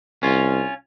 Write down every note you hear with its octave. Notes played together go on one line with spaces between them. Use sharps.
C2 C#4 F4